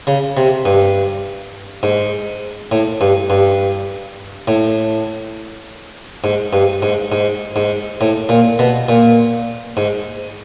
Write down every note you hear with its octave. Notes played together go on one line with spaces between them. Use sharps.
C#3
C3
G2
G#2
A2
G2
G2
A2
G#2
G2
G#2
G#2
G#2
A2
A#2
B2
A#2
G#2